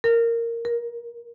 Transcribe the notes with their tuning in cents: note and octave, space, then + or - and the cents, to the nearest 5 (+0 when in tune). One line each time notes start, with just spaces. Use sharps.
A#4 -10
A#4 +25